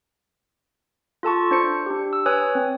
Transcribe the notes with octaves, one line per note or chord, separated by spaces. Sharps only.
F4 A4 A5 C#6
D4 C5 C#7
D4 G4
E6
B4 C#5 G#5 D#6 F#6
C4